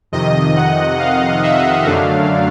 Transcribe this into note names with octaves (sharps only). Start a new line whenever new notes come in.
F2 C3 D#3 D#5
F#5
F5
E5
F#2 D3 F#3 A3 D4 F5